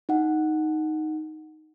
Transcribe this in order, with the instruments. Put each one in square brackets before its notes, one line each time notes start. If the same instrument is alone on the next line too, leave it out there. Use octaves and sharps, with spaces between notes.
[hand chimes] D#4 F#5